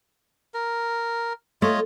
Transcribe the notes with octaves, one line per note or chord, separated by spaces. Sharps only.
A#4
A3 F4 C#5 D#5